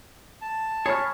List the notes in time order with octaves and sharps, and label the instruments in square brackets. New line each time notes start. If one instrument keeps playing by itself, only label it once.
[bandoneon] A5
[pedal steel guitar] G#4 B5 F6 [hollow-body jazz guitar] C#5